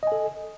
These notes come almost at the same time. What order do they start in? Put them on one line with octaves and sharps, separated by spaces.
D#5 G#5 A4